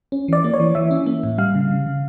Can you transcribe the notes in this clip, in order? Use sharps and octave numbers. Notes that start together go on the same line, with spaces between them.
C#4
E3 D5
A#3
C#5
E3
E3 E5
C#4
A#3
A2
G3 F5
C#3
C#3
C#3